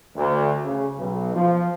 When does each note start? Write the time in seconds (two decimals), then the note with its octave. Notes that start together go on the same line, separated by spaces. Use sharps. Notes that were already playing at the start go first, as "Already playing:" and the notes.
0.15 D2
0.64 C#3
0.98 B1
1.34 F3